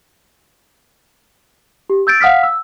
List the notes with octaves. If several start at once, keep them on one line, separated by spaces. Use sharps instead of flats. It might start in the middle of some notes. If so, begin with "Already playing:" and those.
G4
E6 G6 A6 D7
F5 F#5 D#6 F6 B6
E6